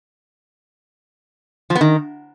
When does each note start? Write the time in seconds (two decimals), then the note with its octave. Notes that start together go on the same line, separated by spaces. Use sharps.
1.70 F3
1.75 B3
1.81 D#3